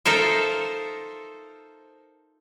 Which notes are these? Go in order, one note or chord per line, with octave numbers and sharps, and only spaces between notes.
D#4 F4 A4 A#4 C5 E5